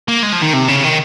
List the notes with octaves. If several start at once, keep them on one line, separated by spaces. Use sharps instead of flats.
A#3
G#3
F3
D#3
C3
C#3
D#3